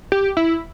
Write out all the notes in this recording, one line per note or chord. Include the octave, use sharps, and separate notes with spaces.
G4
E4